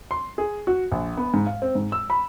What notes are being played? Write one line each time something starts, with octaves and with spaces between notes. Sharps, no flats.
C6
G#4
F#4
A#1
B3
G#2
F5
C4
G#2
E6
B5